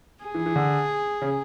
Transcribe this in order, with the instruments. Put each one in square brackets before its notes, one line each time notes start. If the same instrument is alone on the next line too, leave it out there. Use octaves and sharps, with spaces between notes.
[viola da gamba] G#4
[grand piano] E3
E3
D3
C#3